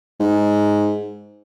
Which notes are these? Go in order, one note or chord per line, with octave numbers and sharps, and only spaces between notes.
G#2